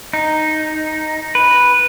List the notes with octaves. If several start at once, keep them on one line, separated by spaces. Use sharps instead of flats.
D#4
B4